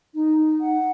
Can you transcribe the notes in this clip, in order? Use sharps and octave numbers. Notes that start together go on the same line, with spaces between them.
D#4
F#5